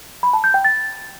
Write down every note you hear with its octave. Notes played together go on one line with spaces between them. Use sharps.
B5
A5
G6
G5
A6